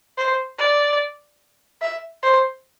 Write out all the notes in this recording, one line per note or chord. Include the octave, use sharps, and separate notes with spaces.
C5
D5
E5
C5